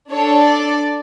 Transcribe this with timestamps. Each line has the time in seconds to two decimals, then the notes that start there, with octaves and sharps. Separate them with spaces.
0.11 D4 A4 C#5
0.45 D5